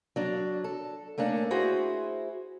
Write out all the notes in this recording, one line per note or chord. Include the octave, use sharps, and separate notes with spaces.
F#3 D4
A4
A3 A#3 C#4 D4
E4 F#4 G#4 C5